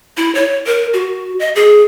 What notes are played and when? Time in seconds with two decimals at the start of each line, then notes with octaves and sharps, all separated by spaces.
0.17 E4
0.35 C#5
0.67 A#4
0.94 F#4
1.39 D#5
1.56 G#4